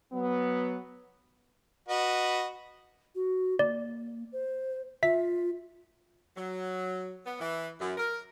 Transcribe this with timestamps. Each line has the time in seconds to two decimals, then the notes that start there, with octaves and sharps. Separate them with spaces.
0.13 F#3 B3
1.89 F#4 B4 D#5
3.15 F#4
3.59 A#3 D5
4.32 C5
5.03 F4 E5 B6
6.36 F#3
7.25 B3
7.40 E3
7.81 F#2
7.98 A#4